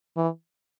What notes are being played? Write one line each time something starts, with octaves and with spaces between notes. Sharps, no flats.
E3